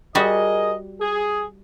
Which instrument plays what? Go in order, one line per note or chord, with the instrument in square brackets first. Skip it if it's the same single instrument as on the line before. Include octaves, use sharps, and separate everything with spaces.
[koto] G3 F#4 [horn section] G#4 A#4 D#5
[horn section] G#4